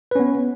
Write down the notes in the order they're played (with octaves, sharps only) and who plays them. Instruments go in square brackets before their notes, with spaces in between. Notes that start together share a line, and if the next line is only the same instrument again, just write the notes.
[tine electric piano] B4
C#4
B3